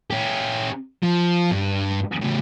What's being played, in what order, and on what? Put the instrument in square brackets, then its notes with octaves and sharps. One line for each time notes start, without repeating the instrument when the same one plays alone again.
[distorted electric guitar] C#4 G4
F3
G2
A2 C#3